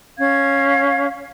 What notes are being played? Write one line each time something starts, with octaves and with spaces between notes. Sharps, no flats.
C#4 F5 G#6